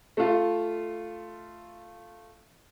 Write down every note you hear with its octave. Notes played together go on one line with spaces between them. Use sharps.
A3 F4